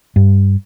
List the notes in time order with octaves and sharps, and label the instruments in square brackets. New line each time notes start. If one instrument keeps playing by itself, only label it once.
[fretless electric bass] G2